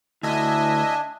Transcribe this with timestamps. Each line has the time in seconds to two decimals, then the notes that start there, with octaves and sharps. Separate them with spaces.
0.23 D2 D4 E4 D#5 E5 G#5